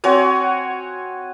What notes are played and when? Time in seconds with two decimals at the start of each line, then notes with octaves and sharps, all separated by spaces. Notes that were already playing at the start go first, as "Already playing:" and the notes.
0.04 C4 F#4 C#5 G#5